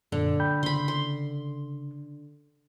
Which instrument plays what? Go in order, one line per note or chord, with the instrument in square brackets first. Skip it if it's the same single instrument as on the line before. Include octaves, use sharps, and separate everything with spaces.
[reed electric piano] F#2 A#2 [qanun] D3
[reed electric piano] G5 B5 G6
[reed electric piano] C#3 [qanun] B5 C6
[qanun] C6